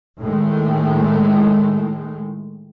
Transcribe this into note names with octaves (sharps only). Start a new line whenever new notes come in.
A2 D#3 G#3 A3